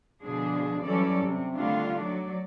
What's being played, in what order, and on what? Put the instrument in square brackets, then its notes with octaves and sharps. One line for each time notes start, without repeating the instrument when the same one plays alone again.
[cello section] B2 D3 F3 D4 G#4
E3 F#3 G3 C#4 A4 D5
C3
D3 D#3 G3 A3 D4 F4
F#3 D5